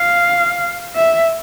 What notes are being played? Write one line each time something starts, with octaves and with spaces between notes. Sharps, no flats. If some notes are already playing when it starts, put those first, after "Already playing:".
Already playing: F5
E5